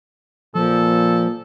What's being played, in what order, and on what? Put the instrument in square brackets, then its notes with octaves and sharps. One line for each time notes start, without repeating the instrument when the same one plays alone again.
[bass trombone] A#2 [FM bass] F3 [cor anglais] A4